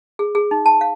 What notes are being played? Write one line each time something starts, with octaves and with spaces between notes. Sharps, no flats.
G#4
G#4
D#4
A5
F5